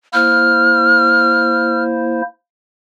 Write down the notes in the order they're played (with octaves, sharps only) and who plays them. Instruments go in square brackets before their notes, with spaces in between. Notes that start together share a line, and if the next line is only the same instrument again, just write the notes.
[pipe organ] A#3 E4 C5 [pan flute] F6